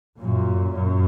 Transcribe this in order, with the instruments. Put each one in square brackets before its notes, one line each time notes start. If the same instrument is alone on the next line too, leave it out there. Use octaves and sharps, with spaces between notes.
[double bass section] F#2 A#2
F#2